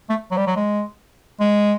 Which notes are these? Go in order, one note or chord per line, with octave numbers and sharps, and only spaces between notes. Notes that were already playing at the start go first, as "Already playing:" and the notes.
A3
F#3
G3
F#3
G#3
G#3